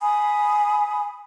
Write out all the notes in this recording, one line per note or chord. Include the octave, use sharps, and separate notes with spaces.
G#5 B5 D#6